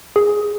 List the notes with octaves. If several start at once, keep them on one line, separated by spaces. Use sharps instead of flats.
G#4